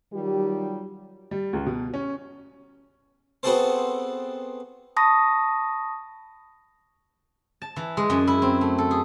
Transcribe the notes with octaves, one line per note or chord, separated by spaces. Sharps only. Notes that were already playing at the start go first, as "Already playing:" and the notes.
D#3 F#3 G3 F4 G4
G3
C#2
B2
C#4
B3 C4 F#4 G#4 A4 C5
A5 B5 C#6 D#6 A#6
A5
E3
G#3
F#2
E4
C4
A3
A4
G#4